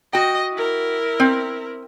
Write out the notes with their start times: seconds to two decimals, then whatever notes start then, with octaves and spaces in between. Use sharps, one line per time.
0.13 F#4 D#5 G5
0.54 E4 A#4
1.20 C4